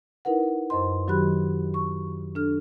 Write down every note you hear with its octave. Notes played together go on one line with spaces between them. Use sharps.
D#4 E4 A#4 B4 F#5
F#2 C5 D#5 C6
D#3 F#3 F#4 G4 B5 F#6
C#6
D4 A4 F6